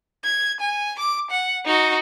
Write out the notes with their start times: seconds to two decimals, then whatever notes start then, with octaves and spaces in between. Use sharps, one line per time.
0.24 G#6
0.61 G#5
0.99 D6
1.31 F#5
1.66 D#4 F#4